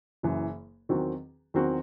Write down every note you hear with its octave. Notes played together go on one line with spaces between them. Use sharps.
F#1 F#2 E3
E2 D#3 F#3 C4 F#4
E2 D#3 F#3 C4 F#4